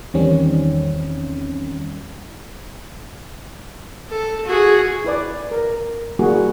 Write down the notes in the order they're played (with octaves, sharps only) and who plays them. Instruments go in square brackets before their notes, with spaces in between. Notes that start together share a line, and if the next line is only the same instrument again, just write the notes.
[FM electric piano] E2 D#3 G3 C4 C#4
[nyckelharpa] A4
F#4 G#4
[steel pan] E4 B4 D5
A#4
G3 A#3 E4 F#4 G#4